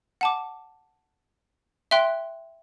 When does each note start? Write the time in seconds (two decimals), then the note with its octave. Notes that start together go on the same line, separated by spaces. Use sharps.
0.21 F#5 A5 D6
1.91 E5 G5 C6 F#6